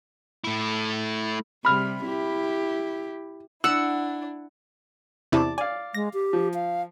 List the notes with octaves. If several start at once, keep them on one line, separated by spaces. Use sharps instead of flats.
A3 E4
C3 G3 B5 F6
E4 G4
D4 E4 F#5 E6
E2 C3 E4 D5 A5 D6
D5 F5 G#5
G#3 A#6
G4
F3
F5